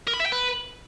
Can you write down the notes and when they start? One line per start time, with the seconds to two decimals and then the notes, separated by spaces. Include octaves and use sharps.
0.08 A#4
0.14 B5
0.20 E5
0.26 G5
0.32 B4